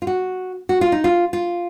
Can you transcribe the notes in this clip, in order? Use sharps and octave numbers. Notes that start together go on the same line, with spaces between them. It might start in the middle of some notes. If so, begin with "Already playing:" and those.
F4
F#4
F#4
F4
D#4
F4
F4